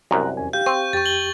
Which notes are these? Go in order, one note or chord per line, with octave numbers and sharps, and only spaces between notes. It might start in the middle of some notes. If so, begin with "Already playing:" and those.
C2 F#2 A#5 F#6
E2 C#4 G#5
G4 F5 G6
C4 C#6
F2 G4 C#6 A6
F#7 G7